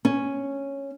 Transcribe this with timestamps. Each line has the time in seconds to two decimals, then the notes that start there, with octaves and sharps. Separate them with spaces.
0.05 C#4